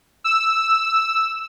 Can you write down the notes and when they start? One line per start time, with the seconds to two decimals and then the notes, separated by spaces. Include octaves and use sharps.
0.24 E6